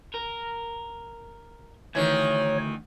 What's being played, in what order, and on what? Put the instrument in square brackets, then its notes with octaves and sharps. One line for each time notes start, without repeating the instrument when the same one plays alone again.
[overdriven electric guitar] A#4
[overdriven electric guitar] D2 [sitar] D#3 E3 [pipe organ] C#5